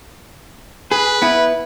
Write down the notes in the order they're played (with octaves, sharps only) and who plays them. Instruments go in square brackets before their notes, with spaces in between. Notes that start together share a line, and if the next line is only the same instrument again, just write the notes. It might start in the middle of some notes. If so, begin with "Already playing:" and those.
[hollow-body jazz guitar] G#4 [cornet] B4
[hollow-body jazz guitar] B3 E4